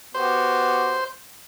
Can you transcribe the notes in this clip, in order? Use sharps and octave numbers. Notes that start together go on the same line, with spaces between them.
B3 F#4 G4 C5